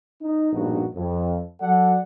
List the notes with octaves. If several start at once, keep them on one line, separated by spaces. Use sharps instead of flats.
D#4
A#1 G2 B2 D#4 F#4
F2
F#3 A4 D5 F#5